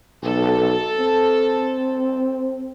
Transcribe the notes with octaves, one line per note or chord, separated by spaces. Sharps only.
B1 A4
C4